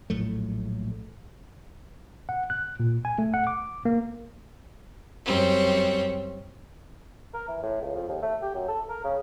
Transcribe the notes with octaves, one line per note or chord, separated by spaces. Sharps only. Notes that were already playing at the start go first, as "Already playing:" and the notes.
A#1 A2 F#3 A3
F#5
F#6
A#2
G#5
A3
F#5
D6
A#3
F#2 G3 C4 C#5
A#4
E3
A2
C#2
F2
D#2
A3
G4
F#2
A4
A#4
C#3